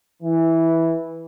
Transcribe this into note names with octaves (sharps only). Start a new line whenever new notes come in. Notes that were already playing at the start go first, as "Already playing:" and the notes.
E3